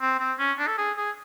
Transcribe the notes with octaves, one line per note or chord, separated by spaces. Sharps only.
C4
C4
C#4
D4
A4
G#4
G#4